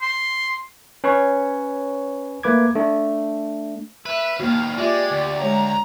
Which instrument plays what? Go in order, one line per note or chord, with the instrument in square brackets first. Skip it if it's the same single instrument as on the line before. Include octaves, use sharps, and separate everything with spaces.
[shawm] C6
[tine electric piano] C#4 B4 C#5 C#6
A3 A#3 B4 D6 G#6
A3 D4
[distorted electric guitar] B4 [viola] E5
[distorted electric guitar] D#2 B2 [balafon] A#3 F#4 [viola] F5
[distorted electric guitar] G#3 [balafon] F4 E5 [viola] G4 D5
[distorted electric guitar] D2
[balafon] G#3 C#5 [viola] A#5